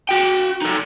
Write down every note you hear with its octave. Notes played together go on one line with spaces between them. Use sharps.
F#4 G5
D#4 A4